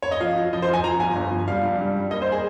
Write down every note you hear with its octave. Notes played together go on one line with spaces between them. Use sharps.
C#5
D#5
F3 F5
F3
F3 D#5
C5
F3 G#5
F3 A#5
G1 G#5
G1
F3
G3 F5
G2
G3
G3
A#3 D#5
C5
G#4